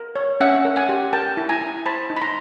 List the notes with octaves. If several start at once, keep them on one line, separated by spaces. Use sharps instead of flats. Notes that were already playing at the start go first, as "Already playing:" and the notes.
Already playing: A#4
C#5
C#4 E5 F#5
A#4
F#5 G#5
G4
A#4 G5 A5
E4
G#5 A#5
E4
C5 A5 B5
D#4
B5
A#5 C6